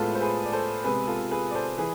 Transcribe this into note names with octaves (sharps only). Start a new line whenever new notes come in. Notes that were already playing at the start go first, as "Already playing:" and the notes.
Already playing: A2 G#3 B3 F4 A4
C5
G#4 B4
D5
A4 C5
C3 G#3 B3 G#4 B4
F4 A4
G#4 B4
D5
A4 C5
E3 G#4 B4